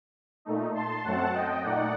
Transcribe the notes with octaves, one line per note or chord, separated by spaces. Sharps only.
A#2 A3 D#4
A5 C6
F#2 F#3 A3 C4 F#5 A5
D#5 G5
A#2 A3 D#4 D5 F#5